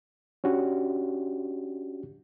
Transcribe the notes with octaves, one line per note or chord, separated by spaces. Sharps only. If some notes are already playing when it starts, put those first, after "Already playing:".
C#4 D4 F#4 G4